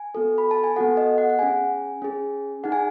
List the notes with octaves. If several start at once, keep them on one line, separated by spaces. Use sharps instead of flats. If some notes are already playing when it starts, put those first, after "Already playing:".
Already playing: G#5
B3 F#4 A4
B5
A5
G#5
B3 F#4 A4 F#5
D#5
F#5
F#5
C#4 G#4 G#5
C#4 G#4
D#4 G#4 F#5
G#5